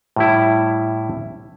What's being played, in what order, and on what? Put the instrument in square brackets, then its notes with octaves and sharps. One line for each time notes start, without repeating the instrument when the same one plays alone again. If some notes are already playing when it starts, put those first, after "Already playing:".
[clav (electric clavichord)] A2 G3 E4